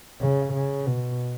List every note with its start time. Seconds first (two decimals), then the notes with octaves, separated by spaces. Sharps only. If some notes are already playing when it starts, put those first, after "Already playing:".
0.21 C#3
0.53 C#3
0.86 B2